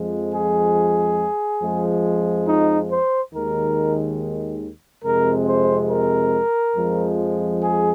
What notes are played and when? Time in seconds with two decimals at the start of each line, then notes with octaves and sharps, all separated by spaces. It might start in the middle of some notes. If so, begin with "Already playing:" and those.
Already playing: F2 F3 G#3
0.32 G#4
1.61 F2 F3 G#3
2.47 D#4
2.89 C5
3.33 D#2 D#3 G#3 A#4
5.03 F2 C3 G#3 A#4
5.47 C5
5.90 A#4
6.76 F2 F3 G#3
7.61 G#4